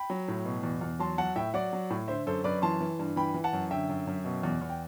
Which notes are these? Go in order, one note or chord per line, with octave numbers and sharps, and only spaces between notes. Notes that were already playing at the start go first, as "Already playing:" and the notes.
Already playing: G5 B5
F#3
A2
B2
E2
E2
F#3 A5 C6
F#3 F#5 A5
A2 E5 G5
F#3 D5 F#5
F#3
A2
D3 C5 E5
F#2 A4 C5
F#2 B4 D5
E3 A5 C6
E3
G2
E3 G5 B5
E3
F#5 A5
F#2
D3 E5 G5
F#2
F#2
B2
E2
E2
G5